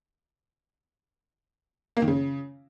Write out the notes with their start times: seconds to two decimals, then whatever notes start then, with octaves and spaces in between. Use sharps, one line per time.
1.97 A#3
2.02 D#3
2.08 C#3